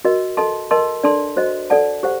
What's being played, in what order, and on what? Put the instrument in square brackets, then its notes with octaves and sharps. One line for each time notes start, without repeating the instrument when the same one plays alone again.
[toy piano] F#4 A#4 D#5
A4 D#5 A5 C6
A#4 D#5 A5 C6
D4 A4 D5 A5 C6
F#4 C5 D#5
A4 D5 F#5 A5
G4 C5 F#5